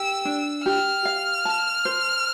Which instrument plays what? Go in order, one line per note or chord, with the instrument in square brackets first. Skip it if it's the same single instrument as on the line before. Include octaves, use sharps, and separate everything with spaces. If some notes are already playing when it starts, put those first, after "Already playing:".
Already playing: [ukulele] G4 [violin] E6
[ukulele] D4
[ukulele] G4 [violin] F6
[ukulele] F5
A5
C5